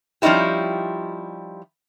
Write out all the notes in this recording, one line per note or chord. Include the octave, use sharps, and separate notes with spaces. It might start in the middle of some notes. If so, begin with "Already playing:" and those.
F3 G3 C#4 D#4 E4 G4